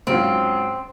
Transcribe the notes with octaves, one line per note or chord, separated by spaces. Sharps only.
G#2 F#3 C4 C#4 F4